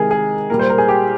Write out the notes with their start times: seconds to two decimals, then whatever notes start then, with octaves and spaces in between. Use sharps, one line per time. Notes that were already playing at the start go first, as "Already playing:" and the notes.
Already playing: C3 D#3 G#3 G#4 A#4
0.11 G#4
0.50 A#2 G3 A#4
0.59 C5
0.69 A#4
0.78 G#4
0.88 G4